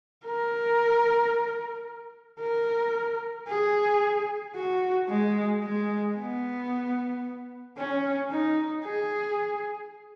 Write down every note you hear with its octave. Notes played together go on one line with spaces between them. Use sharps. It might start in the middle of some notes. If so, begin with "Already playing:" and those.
A#4
A#4
G#4
F#4
G#3
G#3
B3
C#4
D#4
G#4